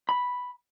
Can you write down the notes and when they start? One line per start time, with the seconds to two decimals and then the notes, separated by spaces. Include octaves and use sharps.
0.09 B5